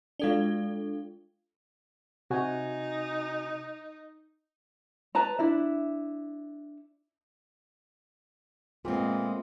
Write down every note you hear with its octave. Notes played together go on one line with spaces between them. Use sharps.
G#3 D4 F4 A4 G7
C3 D#4 F#4 G#5
B4 A5 A#5
D4 E4 E5
A#2 G#3 A3 B3 C4